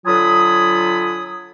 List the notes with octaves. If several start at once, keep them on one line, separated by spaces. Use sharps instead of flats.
D3 F#3 F4 G#5 B5 D#6